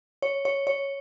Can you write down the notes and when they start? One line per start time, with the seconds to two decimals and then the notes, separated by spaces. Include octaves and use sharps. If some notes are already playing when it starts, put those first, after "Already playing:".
0.22 C#5
0.45 C#5
0.67 C#5